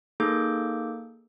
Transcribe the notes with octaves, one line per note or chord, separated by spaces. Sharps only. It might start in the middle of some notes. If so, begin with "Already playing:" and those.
A#3 D#4 G#4 A4 D6 G6